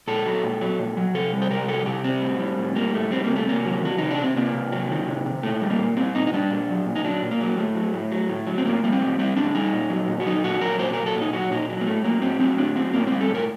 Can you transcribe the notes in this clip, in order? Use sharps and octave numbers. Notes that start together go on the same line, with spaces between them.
A#2 A4
F#3
A#2
F#3
A#2
F#3
C3 A4
G3
C5
C3 A#4
G3 A4
C3 G4
G3 C4
A2
G3
A2
G3 A#3
A2 A3
G3 C4
A#3
C3
A3
C3 A#3
F#3
D#3 F#4
C3 D#4
D4
C3
C4
C3 A#3
C3
F#3
D#3
C3
C3
A#2 A3
G3
A#3
A#2
G3 C4
A#2 D#4
D#4
G3 D4
A#2
F#3
A#2
D#4
F#3 D4
A#2
A#3
F#3
A2 A3
F#3
A2
F#3
A2
F#3
C4
A2 A#3
G3 A#3
C4
A2
G3 C4
A2 D4
G3 D#4
A#2
F#3
A#2
F#4
F#3 D#4
A#2 F#4
F#3 A#4
A#2 C5
F#3 A#4
A4
A#2
D#4
F#3 F#4
A#2 D#4
F#3
A#3
A2 A3
F#3 A#3
A2 C4
F#3 C4
A2 D4
F#3 C4
A2 A#3
G3 C4
A4
A2
A#4